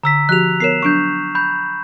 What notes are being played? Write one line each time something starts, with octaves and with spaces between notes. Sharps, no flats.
D3 A#5 E6 B6
F3 F#4 G4 F#6 F7
B3 A#4 C#5 C7 E7
F#3 D4 C#6 G6
B5 G6